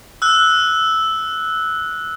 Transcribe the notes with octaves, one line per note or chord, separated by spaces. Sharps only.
E6 F#6